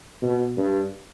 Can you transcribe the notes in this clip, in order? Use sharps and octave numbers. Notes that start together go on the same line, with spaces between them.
B2
G2